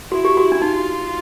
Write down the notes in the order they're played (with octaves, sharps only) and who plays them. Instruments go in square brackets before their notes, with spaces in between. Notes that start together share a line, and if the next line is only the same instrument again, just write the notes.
[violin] E4 [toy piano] F#4
[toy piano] G4
F#4
D4
[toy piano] D#4 [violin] F4